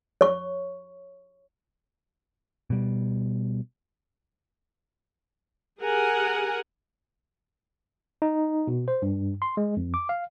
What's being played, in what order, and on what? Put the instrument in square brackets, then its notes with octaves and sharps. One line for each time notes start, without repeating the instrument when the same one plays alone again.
[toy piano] C#5 C#6
[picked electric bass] B2 G3
[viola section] G4 G#4 A#4 F#5 G#5
[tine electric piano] D#4
B2
C5
G2
C6
G#3
F2
D6
F5